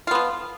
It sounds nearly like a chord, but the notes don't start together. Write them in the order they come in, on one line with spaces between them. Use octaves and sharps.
F4 B3 F3